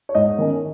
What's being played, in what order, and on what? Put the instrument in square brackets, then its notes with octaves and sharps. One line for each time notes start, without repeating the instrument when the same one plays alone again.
[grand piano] C#5
G#2 D#5
D#3 C#4